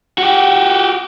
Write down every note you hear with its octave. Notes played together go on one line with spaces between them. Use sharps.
F#4 G4